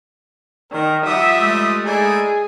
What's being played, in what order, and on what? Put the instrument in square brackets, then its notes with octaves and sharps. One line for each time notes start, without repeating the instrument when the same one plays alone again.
[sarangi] D#3 [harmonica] A#4
[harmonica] F3 G3 D#6 [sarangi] E5 [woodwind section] F#5 A#5 D6
[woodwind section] G#3 A3
[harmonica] D#4 E4 D5 [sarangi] G#4